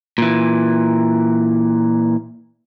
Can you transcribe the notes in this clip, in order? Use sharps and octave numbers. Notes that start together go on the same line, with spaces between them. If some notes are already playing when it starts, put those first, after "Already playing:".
A#2 E3